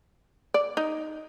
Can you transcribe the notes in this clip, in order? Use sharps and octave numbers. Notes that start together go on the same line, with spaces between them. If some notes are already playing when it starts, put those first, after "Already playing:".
D5
D#4